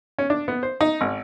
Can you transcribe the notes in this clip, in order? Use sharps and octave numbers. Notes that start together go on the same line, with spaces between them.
C#4
D4
B3
C5
D#4
G#1